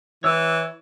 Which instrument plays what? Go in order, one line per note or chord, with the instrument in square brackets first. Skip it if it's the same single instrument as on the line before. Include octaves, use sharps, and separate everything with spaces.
[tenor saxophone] E3 [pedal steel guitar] C#5 E6